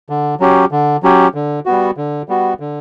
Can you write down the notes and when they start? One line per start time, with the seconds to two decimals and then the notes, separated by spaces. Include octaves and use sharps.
0.10 D3
0.40 F#3 C#4 G4
0.72 D3
1.03 F#3 C#4 G4
1.35 D3
1.66 G3 B3 F#4
1.97 D3
2.29 G3 B3 F#4
2.60 D3